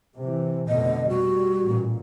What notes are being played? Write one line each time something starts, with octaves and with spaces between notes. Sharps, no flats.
C3 E3
F1 B2 D3 D#5
G3 F#4
A1 A#2